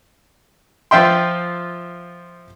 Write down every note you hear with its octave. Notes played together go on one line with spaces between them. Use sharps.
F3 F4 E5 G5 C6